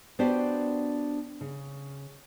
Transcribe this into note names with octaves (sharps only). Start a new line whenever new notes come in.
B3 D4 F#4 G4 C5 D5
C#3